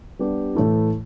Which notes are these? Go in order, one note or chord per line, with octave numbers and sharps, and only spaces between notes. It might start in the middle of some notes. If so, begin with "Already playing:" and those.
G3 B3 D4 G4
A2 E3 A3 E4